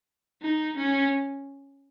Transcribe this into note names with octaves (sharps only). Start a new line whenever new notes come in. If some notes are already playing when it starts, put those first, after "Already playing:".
D#4
C#4